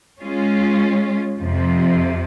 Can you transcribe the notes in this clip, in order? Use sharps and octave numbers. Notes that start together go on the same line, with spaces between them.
G#3 C#4 F4
F2 C3 F3